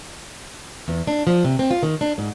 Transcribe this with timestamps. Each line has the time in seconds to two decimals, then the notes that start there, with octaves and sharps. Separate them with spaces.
0.88 E2
1.07 D4
1.27 F3
1.44 C3
1.59 C4
1.71 F4
1.83 D#3
2.01 D4
2.18 G#2